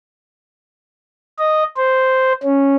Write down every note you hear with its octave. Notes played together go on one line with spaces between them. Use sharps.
D#5
C5
C#4